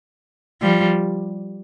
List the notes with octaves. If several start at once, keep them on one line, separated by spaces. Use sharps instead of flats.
F3 G3